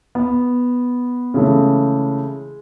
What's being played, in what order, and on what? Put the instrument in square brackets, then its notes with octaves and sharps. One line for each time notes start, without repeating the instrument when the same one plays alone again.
[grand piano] B3
[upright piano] C#3 E3 A3 [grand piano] G#3